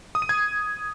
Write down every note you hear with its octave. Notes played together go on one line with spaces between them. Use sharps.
D#6
D#7
G#6